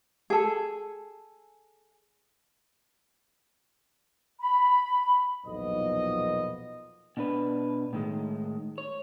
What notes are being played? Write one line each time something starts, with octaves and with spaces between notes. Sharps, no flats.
G#4 A4
B5
B1 E2 A#2 F3 B3 D#5
B2 D4 B4
A2 D#3 G#3
C#5